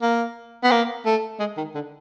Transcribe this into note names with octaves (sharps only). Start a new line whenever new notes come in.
A#3
B3
A#3
A3
G#3
D#3
D3